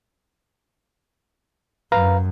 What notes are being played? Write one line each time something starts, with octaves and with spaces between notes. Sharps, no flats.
F#2 B4 F5 A#5